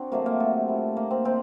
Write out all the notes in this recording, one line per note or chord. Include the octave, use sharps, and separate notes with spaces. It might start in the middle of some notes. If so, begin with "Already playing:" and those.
Already playing: C4 D4 F#4
C3 F#3 A3 A#3
A#3
A3
A#2 G3
A#3
C4
C3 D#3 C4